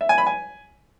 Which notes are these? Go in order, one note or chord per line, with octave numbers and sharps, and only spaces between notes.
E5
G#5
B5
G#5